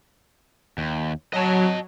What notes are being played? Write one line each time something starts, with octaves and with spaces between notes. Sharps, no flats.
D#2
F#3 D#5 A5